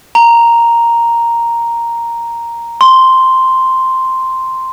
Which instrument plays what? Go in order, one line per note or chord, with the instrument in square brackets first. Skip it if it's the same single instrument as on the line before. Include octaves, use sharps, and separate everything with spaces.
[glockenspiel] A#5
C6